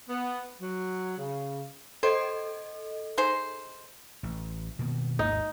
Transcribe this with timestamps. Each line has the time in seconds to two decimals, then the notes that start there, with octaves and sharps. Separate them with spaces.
0.09 B3
0.61 F#3
1.18 C#3
2.03 A4 C5 D#5
3.18 D#4 G#4 C5
4.23 A1
4.79 B2 D#3 A#3
5.19 G#1 D#2 D#4